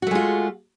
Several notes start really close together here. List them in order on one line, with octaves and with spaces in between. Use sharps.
F#4 A3 G#3 F4